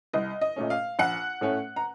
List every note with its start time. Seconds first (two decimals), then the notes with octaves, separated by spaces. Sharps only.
0.13 C2 D#5
0.41 D#5
0.56 A#2 A3 C#4
0.70 F5
0.99 A#1 F#5
1.41 A2 A3 C#4
1.76 A#5